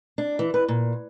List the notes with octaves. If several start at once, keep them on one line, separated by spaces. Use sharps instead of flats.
D4
E3
B4
A#2